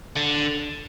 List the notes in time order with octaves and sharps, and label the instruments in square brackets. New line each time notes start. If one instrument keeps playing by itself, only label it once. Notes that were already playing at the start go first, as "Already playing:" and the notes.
[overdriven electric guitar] D3